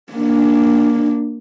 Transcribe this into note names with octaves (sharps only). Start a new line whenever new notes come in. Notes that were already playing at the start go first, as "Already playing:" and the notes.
A#3 D4